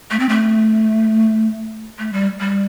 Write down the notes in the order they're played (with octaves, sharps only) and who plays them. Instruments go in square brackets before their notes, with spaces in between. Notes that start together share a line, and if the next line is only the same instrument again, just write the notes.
[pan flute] A3
C4
A3
A3
G3
G3